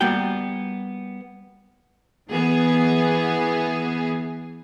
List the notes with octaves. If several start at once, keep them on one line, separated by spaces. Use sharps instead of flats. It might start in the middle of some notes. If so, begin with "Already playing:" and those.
G3 A#3 B3 F#4 G5
E3 B3 G#4